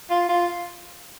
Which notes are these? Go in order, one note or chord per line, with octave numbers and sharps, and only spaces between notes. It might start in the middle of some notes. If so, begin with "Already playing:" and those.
F4
F4